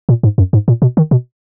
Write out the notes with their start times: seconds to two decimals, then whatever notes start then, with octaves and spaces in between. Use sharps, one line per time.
0.09 A#2
0.23 G#2
0.38 F#2
0.53 G#2
0.68 A#2
0.82 B2
0.97 D#3
1.11 B2